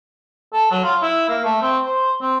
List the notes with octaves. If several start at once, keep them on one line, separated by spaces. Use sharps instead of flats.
A4
F#3
F4
E4
A#3
A3
C4
C5
C4